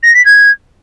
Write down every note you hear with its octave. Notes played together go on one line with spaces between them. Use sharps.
A#6
B6
G#6